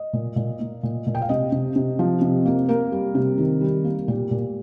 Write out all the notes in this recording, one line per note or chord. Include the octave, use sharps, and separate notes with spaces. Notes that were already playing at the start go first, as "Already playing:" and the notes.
Already playing: D#5
A#2
A#2
A#3
A#2
A#2
G5
F5
C3 D#5
C3
C3
F3
C3
A#3
A#3 A#4
G3
C3
D#3
G3
A#3
A#2 G4
A#2